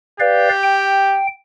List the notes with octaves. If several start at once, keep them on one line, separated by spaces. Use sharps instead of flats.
G4 B4 D5 F5
G5